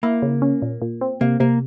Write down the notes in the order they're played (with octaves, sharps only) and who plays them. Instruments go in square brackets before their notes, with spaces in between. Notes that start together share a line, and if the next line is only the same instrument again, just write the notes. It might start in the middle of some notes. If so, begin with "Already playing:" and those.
[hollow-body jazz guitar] A#3 [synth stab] E4
[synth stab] C#3
C#4
A#2
A#2
C4
[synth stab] C3 [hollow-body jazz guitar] A#3
[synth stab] C3 [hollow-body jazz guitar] A#3